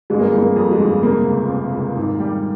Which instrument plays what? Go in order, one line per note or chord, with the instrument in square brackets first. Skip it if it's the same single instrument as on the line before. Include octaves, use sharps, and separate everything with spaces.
[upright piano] G1 [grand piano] G#3
[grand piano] A#3
[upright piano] G1 [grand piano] G#3
[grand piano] A#3
[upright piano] F2
[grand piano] G#3
[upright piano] G1
[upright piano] C3 [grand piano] A#3
[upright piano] C#2
C3
C#2
G#1
G3